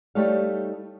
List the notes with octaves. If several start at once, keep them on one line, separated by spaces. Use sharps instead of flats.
G3 A3 D#4 C#5 F5